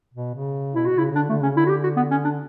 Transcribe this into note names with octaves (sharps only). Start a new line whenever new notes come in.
B2
C#3
B2 E4
B2 F#4
C#3 E4
C#3
D3 D4
D3 A3
C#3 C#4
D3 E4
F#4
G4
F#4
B3
C#4
D4